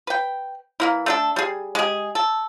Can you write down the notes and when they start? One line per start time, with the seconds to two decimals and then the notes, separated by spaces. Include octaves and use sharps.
0.07 B4 G5
0.80 E3 A#3 E4
1.06 A3 D4 A4
1.36 G3 G#4
1.75 G#3 G4 G#4
2.15 A4